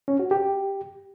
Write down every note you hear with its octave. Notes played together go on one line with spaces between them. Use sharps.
C#4
F#4
G4